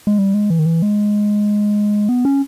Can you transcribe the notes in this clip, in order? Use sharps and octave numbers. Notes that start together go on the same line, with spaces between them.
G#3
G3
G#3
E3
D#3
E3
G#3
B3
C#4